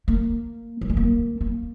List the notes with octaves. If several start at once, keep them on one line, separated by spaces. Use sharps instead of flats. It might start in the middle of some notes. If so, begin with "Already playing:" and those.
A#3
F#3
G#3
A#3
A#3